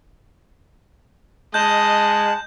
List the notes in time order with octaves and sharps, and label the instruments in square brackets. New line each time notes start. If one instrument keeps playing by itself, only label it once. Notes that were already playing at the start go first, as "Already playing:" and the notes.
[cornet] G#3 [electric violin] D#5 [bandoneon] A5 F#6 [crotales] G6